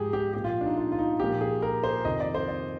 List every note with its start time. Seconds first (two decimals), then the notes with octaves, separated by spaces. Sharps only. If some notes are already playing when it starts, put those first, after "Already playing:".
Already playing: G#2 F3 G4 G#4
0.13 G4
0.34 A#2 F3 G4
0.44 F4
0.61 D4
0.66 D#4
0.77 F4
0.92 F4
0.99 D#4
1.20 A#2 F3 G4
1.41 G#4
1.62 A#4
1.83 C5
2.05 F2 C3 D#3 D#5
2.20 D5
2.35 C5
2.48 D5